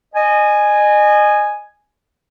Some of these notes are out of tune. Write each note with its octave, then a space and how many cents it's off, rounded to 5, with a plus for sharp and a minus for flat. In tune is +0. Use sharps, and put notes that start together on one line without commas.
D#5 -30 G#5 +0